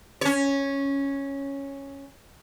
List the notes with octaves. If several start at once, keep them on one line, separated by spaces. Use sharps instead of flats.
C#4 C#5